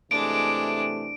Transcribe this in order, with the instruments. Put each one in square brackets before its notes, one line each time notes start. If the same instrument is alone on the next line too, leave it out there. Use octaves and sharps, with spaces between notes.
[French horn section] C3 E3 A3 [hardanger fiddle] G#3 D4 [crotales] D7